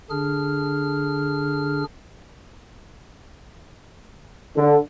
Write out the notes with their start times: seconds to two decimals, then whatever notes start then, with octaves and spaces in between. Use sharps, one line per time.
0.10 D3 D4 G#4 F6
4.57 D3